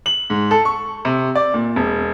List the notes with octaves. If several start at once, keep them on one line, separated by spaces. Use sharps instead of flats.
F#7
G#2
A4
C#6
C3
D5
A#2
E1